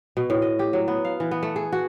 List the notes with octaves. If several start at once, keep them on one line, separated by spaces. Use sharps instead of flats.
B2
A2
D#5
G4
F#3
B3
F5
E3
B3
A3
G#4
F#4